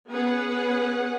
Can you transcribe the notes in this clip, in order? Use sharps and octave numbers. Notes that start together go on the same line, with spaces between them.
B3 C#4 G#4 B4 F#5